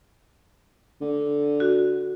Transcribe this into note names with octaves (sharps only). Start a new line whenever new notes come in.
D3
F#4